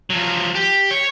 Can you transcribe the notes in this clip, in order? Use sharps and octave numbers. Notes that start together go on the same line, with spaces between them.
F3 F#3
G4
C#5